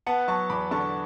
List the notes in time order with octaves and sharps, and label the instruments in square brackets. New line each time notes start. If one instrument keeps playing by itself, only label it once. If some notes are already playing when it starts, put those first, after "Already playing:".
[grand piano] B3 F#5 A5
F#3 A5 C#6
E2 B5 D6
D3 A5 C#6